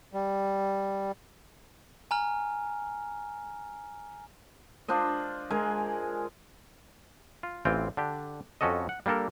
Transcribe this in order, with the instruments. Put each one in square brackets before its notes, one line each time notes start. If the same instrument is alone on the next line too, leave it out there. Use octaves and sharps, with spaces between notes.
[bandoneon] G3
[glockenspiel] G#5 A#5 F6
[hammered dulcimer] D4 F4 C5 D#5
G#3 A#4 G#5
[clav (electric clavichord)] F4
A1 E3 C4 F4 G5
D3 D4 G4
F2 C#4 F#4 A4 D#5
F#5
G3 A#3 D4 A4 A#4